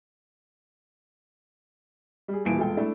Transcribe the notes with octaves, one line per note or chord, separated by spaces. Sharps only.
G3 G#4
D#1 A#2 E3 D7
E1 F4 A4 G5
A3 D4 E4